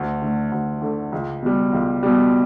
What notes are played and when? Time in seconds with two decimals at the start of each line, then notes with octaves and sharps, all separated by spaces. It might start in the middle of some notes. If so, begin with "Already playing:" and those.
Already playing: D2
0.22 D3 A3
0.52 D2
0.82 D3 A3
1.12 C#2
1.42 B2 G3
1.73 C#2
2.03 B2 G3